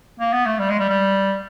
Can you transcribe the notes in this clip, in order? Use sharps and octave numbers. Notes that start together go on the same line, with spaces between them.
A#3
B3
A3
G3
G#3
G3
G3